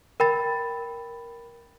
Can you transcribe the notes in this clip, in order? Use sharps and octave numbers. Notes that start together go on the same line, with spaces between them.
A#4 G5 B5 A6